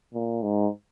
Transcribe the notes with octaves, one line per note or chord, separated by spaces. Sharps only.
A#2
G#2